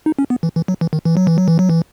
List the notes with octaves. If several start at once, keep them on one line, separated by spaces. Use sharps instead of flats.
D#4
C#4
B3
E3
E3
F#3
E3
D#3
E3
F#3
E3
F#3
E3
F#3
E3